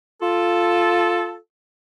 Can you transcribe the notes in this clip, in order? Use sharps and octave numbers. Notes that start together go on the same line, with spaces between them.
F4 A4